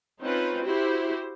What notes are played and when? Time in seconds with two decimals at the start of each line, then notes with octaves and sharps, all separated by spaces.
0.21 C4 C#4 D#4 F4 B4
0.65 E4 F#4 G4 C5